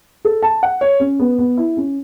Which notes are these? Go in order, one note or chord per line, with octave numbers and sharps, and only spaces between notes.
A4
A5
F#5
C#5
C#4
B3
B3
E4
C#4